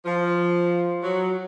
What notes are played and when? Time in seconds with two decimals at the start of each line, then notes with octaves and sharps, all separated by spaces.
0.06 F3
1.03 F#3